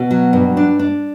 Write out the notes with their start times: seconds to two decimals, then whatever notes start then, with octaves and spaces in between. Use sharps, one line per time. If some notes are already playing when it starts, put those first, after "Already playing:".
Already playing: B2
0.11 F#3
0.33 G2
0.57 D4
0.79 D4